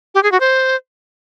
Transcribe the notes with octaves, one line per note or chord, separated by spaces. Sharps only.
G4
G#4
F#4
C5